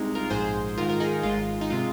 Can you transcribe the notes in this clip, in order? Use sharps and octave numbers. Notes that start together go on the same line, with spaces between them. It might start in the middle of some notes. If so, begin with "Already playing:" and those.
Already playing: C2 C3 G#3 D#4
F4 A#4
A#1 G#2 G#3 G#4 C5
G#2 D#3 G#3 F4 A#4
A#4
D#4 G#4
G#1 G#2 G#3 F4
D#4
C3 G#3 F4